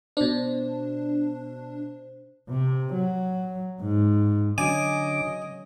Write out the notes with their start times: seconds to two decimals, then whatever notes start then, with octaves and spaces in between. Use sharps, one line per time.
0.17 B2 D4 C5
2.49 C3
2.94 F#3
3.80 G#2
4.58 D3 F#3 C#4 D#5 G#5 D6